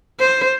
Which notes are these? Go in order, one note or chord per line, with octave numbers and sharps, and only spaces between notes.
C5